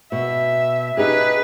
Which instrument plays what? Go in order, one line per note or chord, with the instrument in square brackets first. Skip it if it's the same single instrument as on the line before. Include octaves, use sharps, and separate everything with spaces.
[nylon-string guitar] B2 [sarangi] E5
[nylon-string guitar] D#4 G4 G#4 [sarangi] B4